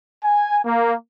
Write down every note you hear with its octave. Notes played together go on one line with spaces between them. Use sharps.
G#5
A#3